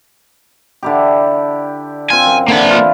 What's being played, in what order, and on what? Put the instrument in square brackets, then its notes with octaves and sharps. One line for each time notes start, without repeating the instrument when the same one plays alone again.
[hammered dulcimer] D3 E4 G4
[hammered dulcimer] C4 F4 [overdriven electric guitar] G#5
[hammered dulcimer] F#2
[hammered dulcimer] D3 E3 [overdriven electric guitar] A#3 B5
[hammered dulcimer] E4 F4